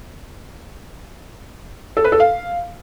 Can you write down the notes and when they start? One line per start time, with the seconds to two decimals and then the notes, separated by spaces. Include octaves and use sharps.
1.97 A4
2.04 B4
2.12 A4
2.20 F5